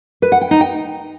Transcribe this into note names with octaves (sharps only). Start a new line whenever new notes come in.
B4
F#5
G5
D#4
G5